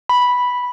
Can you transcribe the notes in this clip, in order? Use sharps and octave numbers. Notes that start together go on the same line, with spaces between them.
B5